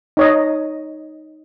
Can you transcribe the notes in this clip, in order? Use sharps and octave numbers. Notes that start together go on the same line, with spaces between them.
D#4 C#5 D#5